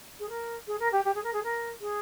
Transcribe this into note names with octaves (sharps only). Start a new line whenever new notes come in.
G#4
A#4
G#4
A#4
G4
G4
G#4
A#4
G#4
A#4
G#4